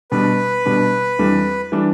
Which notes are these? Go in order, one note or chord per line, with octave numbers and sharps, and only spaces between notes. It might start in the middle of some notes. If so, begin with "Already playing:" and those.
B2 G3 D4 B4
B2 G3 D4
F2 E3 G3 D4
E3 G3 D4